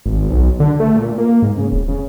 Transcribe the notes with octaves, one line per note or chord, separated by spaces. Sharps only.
G#1
B1
D3
A3
A#2
A#3
G#2
C#3
E1
C#3